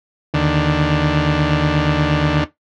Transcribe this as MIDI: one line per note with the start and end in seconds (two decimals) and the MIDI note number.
0.34 2.44 39
0.34 2.44 50